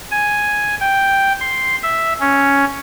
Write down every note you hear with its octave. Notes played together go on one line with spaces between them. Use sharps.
G#5
G5
C6
E5
C#4